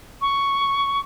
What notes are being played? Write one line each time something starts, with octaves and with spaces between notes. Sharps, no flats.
C#6